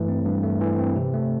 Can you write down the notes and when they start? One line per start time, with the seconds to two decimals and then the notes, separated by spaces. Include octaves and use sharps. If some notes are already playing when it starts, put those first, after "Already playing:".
Already playing: G2 E3 A3
0.08 C4
0.25 G2
0.43 A3
0.61 E3
0.79 C4
0.96 C3
1.14 A3